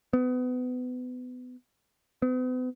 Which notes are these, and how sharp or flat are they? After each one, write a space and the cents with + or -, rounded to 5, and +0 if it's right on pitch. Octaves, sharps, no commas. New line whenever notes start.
B3 +25
B3 +45